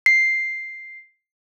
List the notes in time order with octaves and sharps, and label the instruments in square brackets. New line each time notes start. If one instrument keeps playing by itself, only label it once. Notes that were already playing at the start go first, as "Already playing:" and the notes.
[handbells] C7